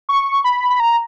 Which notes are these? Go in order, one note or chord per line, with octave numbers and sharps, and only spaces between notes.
C#6
B5
B5
A#5